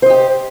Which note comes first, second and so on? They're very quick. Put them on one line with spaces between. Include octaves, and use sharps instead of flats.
C5 D#5 G4